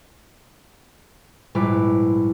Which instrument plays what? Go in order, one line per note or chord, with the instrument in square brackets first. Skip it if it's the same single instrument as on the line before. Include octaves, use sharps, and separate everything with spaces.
[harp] A#1 G#2 G3 E4 B4 D6